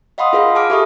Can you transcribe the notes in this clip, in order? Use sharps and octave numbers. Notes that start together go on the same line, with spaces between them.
D#5 F5 F#5 B5 C6 D#6
F4 G#4 A#4 F5 B5
G#4 A5 D6 F6 D7
G4 A4 E5 B5 C#6 D#6